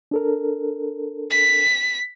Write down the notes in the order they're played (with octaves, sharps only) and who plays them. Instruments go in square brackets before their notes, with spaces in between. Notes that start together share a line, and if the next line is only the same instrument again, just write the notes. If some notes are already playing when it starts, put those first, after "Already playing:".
[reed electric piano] D4 A4 A#4
[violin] B6